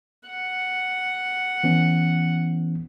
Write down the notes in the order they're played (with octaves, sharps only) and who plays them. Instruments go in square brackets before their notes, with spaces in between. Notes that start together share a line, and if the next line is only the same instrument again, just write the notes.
[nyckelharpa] F#5
[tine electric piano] E3 B3 C#4